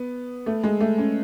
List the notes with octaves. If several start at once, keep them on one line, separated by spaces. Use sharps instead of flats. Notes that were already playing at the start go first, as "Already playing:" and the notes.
Already playing: B3
A3
G#3
A3
C#4